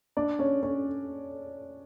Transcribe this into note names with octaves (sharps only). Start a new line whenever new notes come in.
D4 D5
C#4 C#5
C#4 C#5